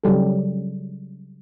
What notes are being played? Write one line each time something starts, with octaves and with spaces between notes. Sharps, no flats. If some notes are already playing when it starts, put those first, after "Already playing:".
C#3 F#3 G3 A4